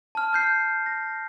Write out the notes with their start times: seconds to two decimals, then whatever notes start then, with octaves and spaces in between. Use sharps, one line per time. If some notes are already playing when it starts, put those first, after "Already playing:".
0.15 A5 F6
0.33 F6 G6 C7
0.86 A#6